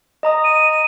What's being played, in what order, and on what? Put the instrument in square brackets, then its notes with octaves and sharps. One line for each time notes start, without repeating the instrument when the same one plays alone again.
[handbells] D#5 A#5 D#6
[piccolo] D#7